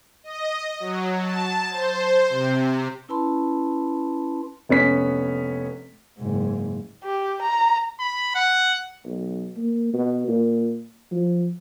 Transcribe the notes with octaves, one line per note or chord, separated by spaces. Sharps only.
D#5
F#3
A5
C5
C3
C#4 E4 B4 A5 B5 C6
F1 B3 C#4 B6
F#1 G#2
G4
A#5
B5
F#5
B1
A#3
B2
A#2
F3